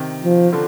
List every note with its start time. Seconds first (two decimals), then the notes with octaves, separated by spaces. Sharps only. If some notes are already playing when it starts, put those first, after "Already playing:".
Already playing: C3 D#3
0.24 F3
0.52 D3 F3